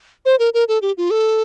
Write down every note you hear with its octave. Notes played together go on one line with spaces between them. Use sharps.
C5
A#4
A#4
A4
G4
F4
A4